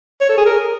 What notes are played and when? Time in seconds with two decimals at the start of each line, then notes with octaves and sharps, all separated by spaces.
0.21 C#5
0.29 A4
0.37 G#4
0.46 A#4